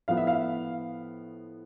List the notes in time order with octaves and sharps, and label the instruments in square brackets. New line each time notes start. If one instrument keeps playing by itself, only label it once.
[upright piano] A2 F3 B3 F5
E5
F5